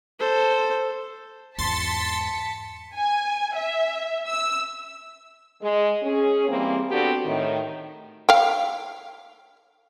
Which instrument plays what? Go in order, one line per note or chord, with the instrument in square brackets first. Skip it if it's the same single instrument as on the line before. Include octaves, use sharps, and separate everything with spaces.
[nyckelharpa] A4 C5
[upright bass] E2 G#2 [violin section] A5 B6 C#7 [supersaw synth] C6 A6
[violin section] G#5
E5
E6
[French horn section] G#3
C#4 G#4
E3 G3 A#3 C4
B3 C4 D4 F#4 G4 A4
A2 D#3
[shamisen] F5 G5